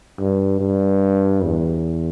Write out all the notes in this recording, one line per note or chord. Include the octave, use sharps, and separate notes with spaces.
G2
G2
E2